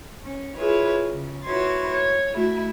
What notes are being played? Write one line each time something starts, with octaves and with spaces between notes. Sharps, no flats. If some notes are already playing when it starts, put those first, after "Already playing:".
C#4
E4 F4 G#4 B4 C#5
C#3
E4 F#4 B4 C#5 C6 A6
C#5
A3 E4 F#4